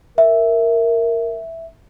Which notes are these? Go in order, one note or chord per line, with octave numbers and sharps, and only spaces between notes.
A#4 E5